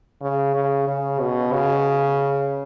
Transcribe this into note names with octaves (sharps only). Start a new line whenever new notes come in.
C#3
C#3
C#3
B2
C#3